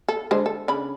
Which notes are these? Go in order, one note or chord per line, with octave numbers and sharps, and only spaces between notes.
A4
D3 G#3 C5
A4
C#3 D4 B5